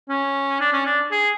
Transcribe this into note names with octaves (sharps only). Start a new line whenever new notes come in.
C#4
D4
C#4
D4
G#4